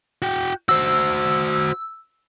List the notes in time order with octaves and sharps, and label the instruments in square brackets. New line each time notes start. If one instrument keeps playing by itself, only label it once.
[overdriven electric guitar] F#4 G5
[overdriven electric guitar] F#4 C5 [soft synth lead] E6